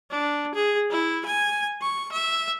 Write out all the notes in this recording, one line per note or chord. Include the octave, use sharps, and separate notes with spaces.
D4
G#4
E4
G#5
C#6
E5